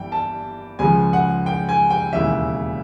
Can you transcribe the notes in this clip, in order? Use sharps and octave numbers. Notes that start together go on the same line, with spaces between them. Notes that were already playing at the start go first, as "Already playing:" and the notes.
Already playing: G1 G2 E3 G5
A5
C#2 C#3 F3 G#3 G#5
F#5
G5
G#5
G5
E1 D#2 C#3 E3 E5